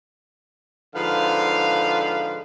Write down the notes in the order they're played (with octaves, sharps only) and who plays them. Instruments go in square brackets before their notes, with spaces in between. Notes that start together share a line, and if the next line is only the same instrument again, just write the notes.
[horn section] G#2 D3 F3 B4 F5